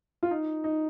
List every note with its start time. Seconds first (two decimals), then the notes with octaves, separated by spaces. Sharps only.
0.23 F4
0.31 D#4
0.64 D#4